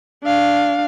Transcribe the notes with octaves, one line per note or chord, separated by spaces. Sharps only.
D4 F5